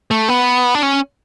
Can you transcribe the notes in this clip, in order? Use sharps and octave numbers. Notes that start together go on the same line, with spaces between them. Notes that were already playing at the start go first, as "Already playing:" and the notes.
A3
B3
D4
C#4